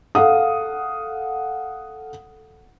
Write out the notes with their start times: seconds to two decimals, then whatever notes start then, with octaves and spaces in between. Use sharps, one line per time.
0.15 A4 F5 F#5 D#6